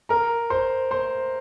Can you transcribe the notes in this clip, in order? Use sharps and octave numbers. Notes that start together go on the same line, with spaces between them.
A#4 A#5
C5 C6
C5 C6